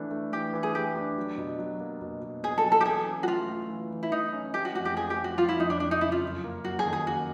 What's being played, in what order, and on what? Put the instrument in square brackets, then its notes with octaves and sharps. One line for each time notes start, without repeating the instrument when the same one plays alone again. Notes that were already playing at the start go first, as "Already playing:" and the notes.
Already playing: [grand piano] E3 A3 D4
A3
[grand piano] E3 [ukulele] G4
[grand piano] E3
[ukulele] G#4
[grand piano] A3 [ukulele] G4
[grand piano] D4
F#3
B2
F#3
A#3
B2
B2
[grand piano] B2 [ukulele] G#4
[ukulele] A4
[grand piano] F#3
[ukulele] A4
G4
[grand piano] E3 [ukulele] G#4
[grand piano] C#4
[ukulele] F#4
[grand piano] A3 [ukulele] F4
[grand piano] A3
E3
E3
[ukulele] E4
[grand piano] E3 [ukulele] D#4
[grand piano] C#4
[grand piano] A3 [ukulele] G4
[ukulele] F#4
[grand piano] F2 [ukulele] F#4
[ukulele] G4
[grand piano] F3 [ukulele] G#4
[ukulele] G4
[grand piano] F3
[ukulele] F#4
[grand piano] F3 [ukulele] F4
[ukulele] E4
[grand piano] F2 [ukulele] D#4
[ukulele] D4
[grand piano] F2 [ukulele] D4
[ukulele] D#4
[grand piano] C#3 [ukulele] E4
[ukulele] F4
[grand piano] F#2
A#3
[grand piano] F#3 [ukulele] F#4
[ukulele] G#4
[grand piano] D#3
[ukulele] G#4
[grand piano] A#3 [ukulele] F#4